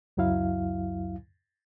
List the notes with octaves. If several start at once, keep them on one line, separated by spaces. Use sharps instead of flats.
C#2 F#2 F#3 E4 F5